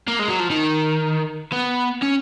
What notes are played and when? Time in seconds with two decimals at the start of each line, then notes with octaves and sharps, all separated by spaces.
0.08 A#3
0.19 G#3
0.29 F#3
0.40 F3
0.50 D#3
1.52 B3
2.03 C#4